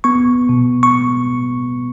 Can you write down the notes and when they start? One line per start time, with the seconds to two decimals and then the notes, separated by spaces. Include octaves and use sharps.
0.04 B3 C#6
0.49 B2
0.83 C#6